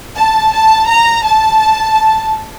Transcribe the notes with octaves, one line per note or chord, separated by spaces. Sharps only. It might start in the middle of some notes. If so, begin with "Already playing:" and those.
A5
A5
A#5
A5